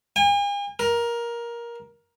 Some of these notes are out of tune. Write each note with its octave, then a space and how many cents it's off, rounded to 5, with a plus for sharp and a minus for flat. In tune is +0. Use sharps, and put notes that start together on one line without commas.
G#5 -45
A#4 +15